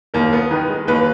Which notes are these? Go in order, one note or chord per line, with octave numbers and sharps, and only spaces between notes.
D#2 A#4
B3
D#3 B4
G#3
D#2 B4